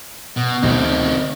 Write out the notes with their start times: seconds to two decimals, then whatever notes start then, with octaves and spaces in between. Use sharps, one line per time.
0.37 B2
0.63 D2 C3 G3 C4 D#4